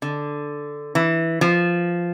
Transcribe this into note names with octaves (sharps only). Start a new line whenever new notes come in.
D3
E3
F3